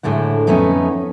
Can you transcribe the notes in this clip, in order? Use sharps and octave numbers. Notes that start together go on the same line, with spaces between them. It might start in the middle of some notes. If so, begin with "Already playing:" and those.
D2 A2 D3 G#3 F#5
F2 A3 B3 C#4 D#4